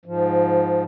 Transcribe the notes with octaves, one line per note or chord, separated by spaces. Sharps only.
G#2 F3